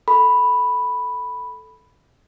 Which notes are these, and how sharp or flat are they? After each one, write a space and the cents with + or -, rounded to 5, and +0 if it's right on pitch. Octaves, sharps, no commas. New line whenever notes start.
A4 +0 B5 +0